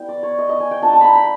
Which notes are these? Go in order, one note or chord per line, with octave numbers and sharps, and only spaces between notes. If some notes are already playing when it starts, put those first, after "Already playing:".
Already playing: G3 B3 E4 G5
D5
C#5
D#5
D#5
G#5
G5
A#3 D4 F4 A5
A5
A#5 B5
B5